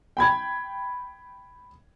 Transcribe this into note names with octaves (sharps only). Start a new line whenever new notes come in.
G5 B5 G#6